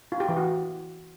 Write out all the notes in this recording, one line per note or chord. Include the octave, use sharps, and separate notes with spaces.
F4
G4
E3
F#4